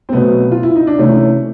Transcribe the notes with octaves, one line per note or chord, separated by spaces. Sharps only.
C4
B2 F#3 A3 B3
F4
E4
D#4
D4
C3 E3 A3 C#4